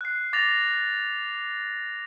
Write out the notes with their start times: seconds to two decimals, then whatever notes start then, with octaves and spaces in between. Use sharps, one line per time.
0.01 F#6 C7
0.33 D6 A6 A#6 C7 F7